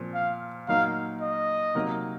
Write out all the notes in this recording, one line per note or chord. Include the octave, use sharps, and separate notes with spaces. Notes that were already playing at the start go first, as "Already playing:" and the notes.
Already playing: A#2 F3 C4
F5
A#2 F#3 A#3 D#4 F5
D#5
C3 F#3 A#3 D#4 A#4